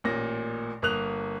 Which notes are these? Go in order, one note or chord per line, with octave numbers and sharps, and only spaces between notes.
A1 A#2 A#6
G1 A#3 D#6 F#6 F7